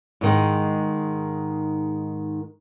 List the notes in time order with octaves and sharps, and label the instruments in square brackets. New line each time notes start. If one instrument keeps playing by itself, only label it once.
[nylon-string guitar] G#2 D#3 G#3